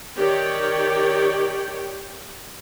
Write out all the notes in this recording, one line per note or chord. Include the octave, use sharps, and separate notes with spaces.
D#3 G4 C#5 D5 G5